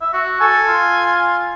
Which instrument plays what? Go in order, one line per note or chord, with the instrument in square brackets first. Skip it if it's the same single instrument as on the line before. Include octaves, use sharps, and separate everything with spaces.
[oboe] E5
F#4
[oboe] A4 [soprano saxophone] G#5
[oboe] F4